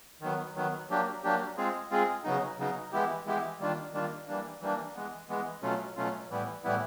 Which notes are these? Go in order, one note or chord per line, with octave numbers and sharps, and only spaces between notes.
D#3 F#3 B3
D#3 F#3 B3
F#3 A#3 D4 G4
F#3 A#3 D4 G4
G#3 C4 F4 G#4
G#3 C4 F4 G#4
C#3 F#3 B3 D#4
C#3 F#3 B3 D#4
E3 G#3 B3 E4 G4
E3 G#3 B3 E4 G4
D#3 G3 A#3 D4 F4
D#3 G3 A#3 D4 F4
E3 G3 A#3 D4
E3 G3 A#3 D4
E3 G#3 B3
E3 G#3 B3
B2 F#3 A3 C#4 F4
B2 F#3 A3 C#4 F4
A2 E3 G3 B3 E4
A2 E3 G3 B3 E4